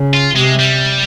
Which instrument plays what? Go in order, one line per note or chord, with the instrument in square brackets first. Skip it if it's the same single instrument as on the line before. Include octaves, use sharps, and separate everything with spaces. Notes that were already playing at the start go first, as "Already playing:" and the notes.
Already playing: [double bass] C#3
[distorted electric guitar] F4
[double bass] C3 [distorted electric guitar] G#3
[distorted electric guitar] G3